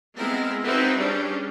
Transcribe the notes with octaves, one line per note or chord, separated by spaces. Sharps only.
G#3 B3 C4 E4 A#4
C4 D#4 E4 F#4 B4
G3 C#4 D4 G#4